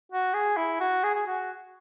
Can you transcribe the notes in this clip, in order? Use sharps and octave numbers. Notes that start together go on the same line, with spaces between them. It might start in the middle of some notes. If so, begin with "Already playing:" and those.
F#4
G#4
E4
F#4
G#4
G#4
F#4